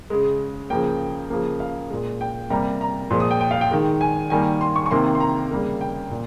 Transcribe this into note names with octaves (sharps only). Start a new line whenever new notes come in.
C#3 G#3
C#3 F3 A#3 G5
C#3 F3 A#3
F5
A#2 G#3
G5
C3 G3 A#3 A#5
A#5
A#2 F3 G#3 C6
D#6
G5
G5
F5
G5
D#3 G#3
G#5
D#3 G3 A#3 G#5
C6
C#6
C#6
C3 D#3 A#3 C6
C6
A#5
C#3 G3 A#3
G5
A#2